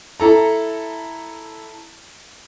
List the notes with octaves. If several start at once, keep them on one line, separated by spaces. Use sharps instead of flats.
E4 A4 A#5